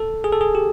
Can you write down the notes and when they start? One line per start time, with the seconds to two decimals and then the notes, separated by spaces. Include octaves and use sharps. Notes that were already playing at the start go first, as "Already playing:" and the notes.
Already playing: A4
0.24 G#4
0.33 A4
0.41 G#4
0.55 G4